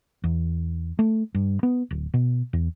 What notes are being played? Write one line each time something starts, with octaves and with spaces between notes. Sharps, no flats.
E2
A3
G2
B3
D1
B2
E2